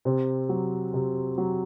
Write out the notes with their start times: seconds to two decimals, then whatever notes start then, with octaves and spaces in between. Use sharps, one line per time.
0.05 C3 C4
0.49 F#3
0.94 C3
1.38 F#3